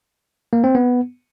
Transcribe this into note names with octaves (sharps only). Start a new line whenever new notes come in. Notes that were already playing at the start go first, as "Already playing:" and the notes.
A#3
C4
B3